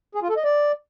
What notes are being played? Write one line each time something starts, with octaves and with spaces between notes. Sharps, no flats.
G#4
F4
A4
D#5
D5